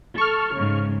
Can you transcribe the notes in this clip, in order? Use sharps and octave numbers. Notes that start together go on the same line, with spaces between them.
A4 C#6 F6
G#2 C#3